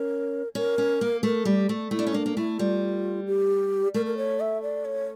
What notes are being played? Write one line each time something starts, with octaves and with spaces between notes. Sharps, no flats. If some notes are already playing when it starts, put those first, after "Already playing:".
Already playing: C#4 A#4
C#4 A#4
C#4
A#3
A3 A#4
G3 G4
A3
A3 E4
D4
C#4
A#3 D4
A#3
A3 E4
G3 F4
G4
A3 A#4
A#4
C#5
E5
D5
C#5